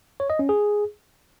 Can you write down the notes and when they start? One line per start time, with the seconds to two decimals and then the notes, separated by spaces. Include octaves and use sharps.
0.20 C#5
0.30 D#5
0.39 C#4
0.49 G#4